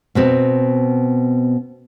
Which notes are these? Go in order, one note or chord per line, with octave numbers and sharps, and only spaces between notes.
B2 B3 C4